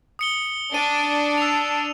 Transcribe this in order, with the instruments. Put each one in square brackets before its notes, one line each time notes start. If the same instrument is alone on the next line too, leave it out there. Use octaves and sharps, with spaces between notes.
[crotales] D#6 C#7 G7
[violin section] D4 [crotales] D#7
[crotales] E6 F7